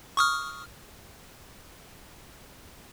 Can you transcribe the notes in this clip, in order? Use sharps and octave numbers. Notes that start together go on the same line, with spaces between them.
C#6 D#6 F6